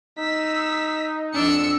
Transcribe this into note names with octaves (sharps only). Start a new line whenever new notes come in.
D#4 E6 B6
F2 D4 E6 C#7